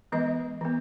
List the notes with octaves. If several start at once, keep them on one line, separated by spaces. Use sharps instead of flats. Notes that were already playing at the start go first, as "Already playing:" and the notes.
E3 G#3 B3 D#5
E3 B3